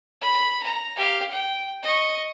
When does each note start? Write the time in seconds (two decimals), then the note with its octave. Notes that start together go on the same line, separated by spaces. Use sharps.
0.21 B5
0.63 A#5
0.97 G4 F5
1.31 G5
1.83 D#5 C#6